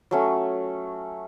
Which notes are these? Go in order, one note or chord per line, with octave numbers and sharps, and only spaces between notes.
F#3 A3 C#4